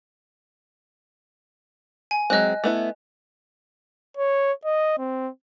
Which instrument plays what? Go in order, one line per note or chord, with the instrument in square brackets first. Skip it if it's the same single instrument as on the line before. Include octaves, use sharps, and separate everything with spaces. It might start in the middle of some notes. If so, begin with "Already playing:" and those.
[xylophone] G#5
[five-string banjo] F#3 G#3 C4 [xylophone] D#5 F#6
[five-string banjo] A3 B3 E4
[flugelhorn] C#5
D#5
C4